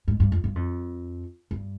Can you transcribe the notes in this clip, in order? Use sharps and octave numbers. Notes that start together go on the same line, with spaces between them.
G#2
G2
F2
G2
F2
G2